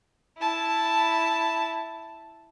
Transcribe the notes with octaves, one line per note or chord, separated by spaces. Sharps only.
E4 A5